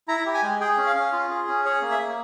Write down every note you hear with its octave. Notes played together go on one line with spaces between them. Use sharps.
E4 A#5
G4
G#5
G#3
G#4 G5
C#4
F5
C#4
F4
G#4
C#4
G#4 C#5
A#3
E5
A#3